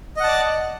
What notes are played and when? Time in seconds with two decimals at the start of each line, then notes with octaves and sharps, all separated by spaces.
0.17 D#5
0.20 F#5
0.23 A5
0.27 D5